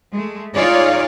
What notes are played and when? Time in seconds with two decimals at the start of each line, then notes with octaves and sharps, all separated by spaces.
0.11 G#3 A3
0.55 D#4 F4 G#4 C#5 D5 F5